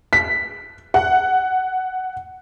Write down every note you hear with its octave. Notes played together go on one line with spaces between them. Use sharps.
B6
F#5